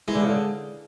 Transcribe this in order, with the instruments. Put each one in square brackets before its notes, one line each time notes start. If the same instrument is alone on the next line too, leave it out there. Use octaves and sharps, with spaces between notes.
[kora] E3 [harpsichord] G#3
[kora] D3
C#3
D3